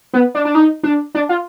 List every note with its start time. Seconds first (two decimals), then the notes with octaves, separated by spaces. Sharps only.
0.13 B3
0.35 D4
0.45 D4
0.55 D#4
0.83 D4
1.15 D4
1.29 F4